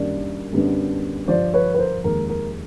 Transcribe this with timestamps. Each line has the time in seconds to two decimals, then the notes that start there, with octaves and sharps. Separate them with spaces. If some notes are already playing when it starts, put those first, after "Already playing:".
Already playing: F#2 D#3 G3 A#3 D4 D5
0.53 F#2 D3 G3 B3 D4
1.28 G2 D3 F3 C5 D5
1.54 B4 C#5
1.74 B4
1.78 A#4 C5
2.04 F1 D#2 D#3 G#3 A#4
2.29 A#4